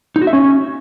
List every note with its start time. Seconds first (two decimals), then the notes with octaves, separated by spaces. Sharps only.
0.16 D#4
0.22 F#4
0.27 E5
0.33 C#4